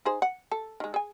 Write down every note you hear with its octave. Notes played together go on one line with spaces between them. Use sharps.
D#4 G#4 C5
F#5
A4
D#3 G#3
G#4 G#5